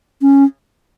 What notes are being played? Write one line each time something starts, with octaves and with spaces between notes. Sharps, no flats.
C#4